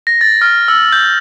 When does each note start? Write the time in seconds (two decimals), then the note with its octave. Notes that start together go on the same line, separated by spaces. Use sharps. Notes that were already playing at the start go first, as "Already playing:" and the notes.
0.07 A#6
0.21 A6
0.41 F6
0.68 E6
0.92 G6